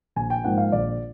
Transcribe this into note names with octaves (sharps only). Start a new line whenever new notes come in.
A#1 G#5
G5
G#2 F3 A#3 F#5
F5
A#1 D5